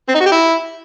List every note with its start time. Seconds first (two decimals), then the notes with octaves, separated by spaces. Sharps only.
0.09 C4
0.15 D#4
0.20 F#4
0.26 G4
0.32 E4